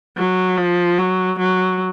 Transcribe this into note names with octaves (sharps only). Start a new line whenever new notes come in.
F#3
F3
F#3
F#3